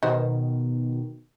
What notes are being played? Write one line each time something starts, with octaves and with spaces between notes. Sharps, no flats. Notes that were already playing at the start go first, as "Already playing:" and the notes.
B2 D#3 D#4 F#4 C5